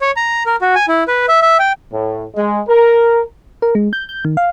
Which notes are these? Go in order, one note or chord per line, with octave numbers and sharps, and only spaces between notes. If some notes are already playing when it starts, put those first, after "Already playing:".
C#5
A#5
A#4
F#4
G#5
E4
B4
E5
E5
G5
A2
G#3
A#4
A#4
G#3
G6
G6
D#3
F5